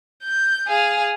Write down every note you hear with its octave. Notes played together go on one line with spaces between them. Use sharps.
G6
G#4 F5